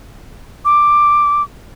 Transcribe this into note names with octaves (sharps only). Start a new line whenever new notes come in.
D6